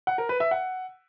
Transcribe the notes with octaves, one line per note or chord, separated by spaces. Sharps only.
F#5
A#4
B4
E5
F#5